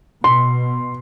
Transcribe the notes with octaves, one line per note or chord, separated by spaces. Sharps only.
B2 C6